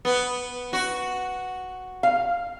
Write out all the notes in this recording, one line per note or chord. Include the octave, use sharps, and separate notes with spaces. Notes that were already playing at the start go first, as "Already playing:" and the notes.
B3
F#4
F5